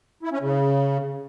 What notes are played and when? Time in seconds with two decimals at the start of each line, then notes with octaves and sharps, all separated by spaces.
0.23 E4
0.32 C#4
0.41 C#3